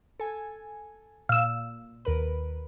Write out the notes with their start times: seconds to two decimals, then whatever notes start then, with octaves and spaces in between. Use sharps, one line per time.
0.20 A4 G#5
1.29 A#2 F5 E6
2.05 D#2 A#4 B4